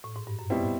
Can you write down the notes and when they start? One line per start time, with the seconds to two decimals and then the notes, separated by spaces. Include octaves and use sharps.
0.04 A2
0.16 G#2
0.27 G2
0.39 F#2
0.50 F2 B2 G3 C4 E4